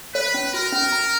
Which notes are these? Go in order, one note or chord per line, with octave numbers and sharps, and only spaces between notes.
B4 C#5
C#4
F#4 A#4
C#4
A#5